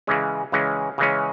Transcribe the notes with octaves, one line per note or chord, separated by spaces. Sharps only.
C#3 E3 G#3 C#4
C#3 E3 G#3 C#4
C#3 E3 G#3 C#4